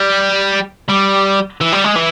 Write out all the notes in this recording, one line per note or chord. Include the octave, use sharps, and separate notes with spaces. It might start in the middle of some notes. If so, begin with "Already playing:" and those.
Already playing: G3
G3
E3
G3
G#3
E3